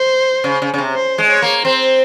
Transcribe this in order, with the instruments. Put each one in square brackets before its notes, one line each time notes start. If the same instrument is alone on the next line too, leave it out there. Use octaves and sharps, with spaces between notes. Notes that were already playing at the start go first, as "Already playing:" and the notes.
Already playing: [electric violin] C5
[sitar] C#3
C#3
C#3
C3
[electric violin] C5
[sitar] G#3
[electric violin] C#5
[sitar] A#3
[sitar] C4 [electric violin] C5